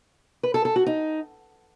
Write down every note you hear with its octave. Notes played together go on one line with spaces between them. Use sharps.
B4
A4
A4
F#4
D#4